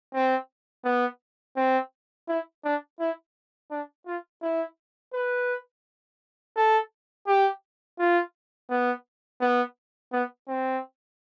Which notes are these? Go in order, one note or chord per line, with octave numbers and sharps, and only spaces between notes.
C4
B3
C4
E4
D4
E4
D4
F4
E4
B4
A4
G4
F4
B3
B3
B3
C4